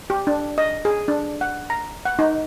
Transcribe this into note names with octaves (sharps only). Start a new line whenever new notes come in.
G4
D4
D#5
G#4
D4
F#5
A#5
F#5
D#4